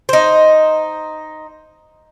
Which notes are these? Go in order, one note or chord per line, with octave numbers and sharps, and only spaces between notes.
D#4 C5